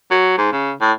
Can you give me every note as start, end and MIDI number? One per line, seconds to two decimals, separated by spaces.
0.11 0.35 54
0.38 0.51 44
0.53 0.73 49
0.81 0.92 45